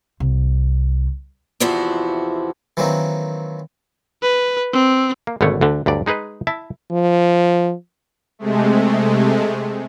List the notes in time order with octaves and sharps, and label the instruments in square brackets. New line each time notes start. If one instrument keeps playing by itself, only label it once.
[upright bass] C2
[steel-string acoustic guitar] E2 C3 F3 E4 F#4
[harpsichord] D#3 E3 F#3 A#3 C4
[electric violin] B4
C4
[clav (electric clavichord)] A#3
G#1 B2 D3 A3 C#5
D2 D3
D2 G2 F#3 D5
G#3 D#4 G#4 B4 D#5
E4 E5 A5
[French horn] F3
[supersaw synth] C3 G#3 A3